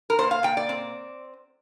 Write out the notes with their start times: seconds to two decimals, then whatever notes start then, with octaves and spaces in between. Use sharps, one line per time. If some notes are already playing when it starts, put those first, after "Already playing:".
0.10 A#4
0.19 A#2 C5
0.31 F5
0.43 A#2 G5
0.57 D5
0.69 C4